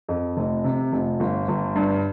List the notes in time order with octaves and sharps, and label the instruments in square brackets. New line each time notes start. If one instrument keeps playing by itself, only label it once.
[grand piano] F2
F1
C3
F1
G1
G1
G2